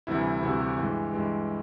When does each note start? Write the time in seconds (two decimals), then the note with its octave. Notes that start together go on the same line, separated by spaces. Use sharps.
0.07 D2 C3 E3 G3 E4
0.42 D2 C3 E3 G3 F#4
0.54 F#4
0.61 G4
0.77 G2 E3 G#3
1.13 G2 E3 G#3